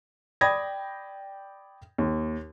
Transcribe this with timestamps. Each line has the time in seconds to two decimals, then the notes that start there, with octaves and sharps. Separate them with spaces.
0.41 D5 G5 B5 D#6 G#6 A#6
1.98 D#2